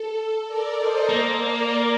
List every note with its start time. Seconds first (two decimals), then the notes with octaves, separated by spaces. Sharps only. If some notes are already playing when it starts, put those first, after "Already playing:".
Already playing: A4
0.16 A4
0.47 A#4 D5
0.78 C5 D#5
1.09 A#3
1.40 A#4 D5